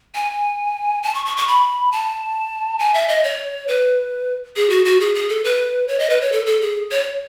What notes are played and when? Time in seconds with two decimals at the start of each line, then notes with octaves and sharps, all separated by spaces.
0.15 G#5
1.03 A5
1.14 C#6
1.26 C#6
1.37 C#6
1.48 B5
1.92 A5
2.79 G#5
2.94 E5
3.08 D#5
3.24 C#5
3.68 B4
4.56 G#4
4.70 F#4
4.85 F#4
5.00 G#4
5.15 G#4
5.29 A4
5.44 B4
5.88 C#5
5.99 D#5
6.10 B4
6.21 C#5
6.32 A4
6.46 A4
6.61 G#4
6.91 C#5